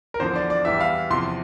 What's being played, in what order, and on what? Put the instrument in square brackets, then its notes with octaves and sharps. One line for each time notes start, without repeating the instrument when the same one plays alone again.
[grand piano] A#4
E2 D3 F3 C5
D5
D5
E2 E3 G3 E5
F5
E2 C3 F3 C6